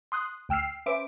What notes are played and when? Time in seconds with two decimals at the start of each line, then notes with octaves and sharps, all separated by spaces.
0.12 C6 D#6 F#6
0.49 D2 G5 E6 F6 C7
0.86 C#4 B4 C5 E5 D6 D7